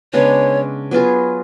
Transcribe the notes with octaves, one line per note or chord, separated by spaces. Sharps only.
C#3 G#3 B3 D4 C#5
F#3 B3 F4 G#4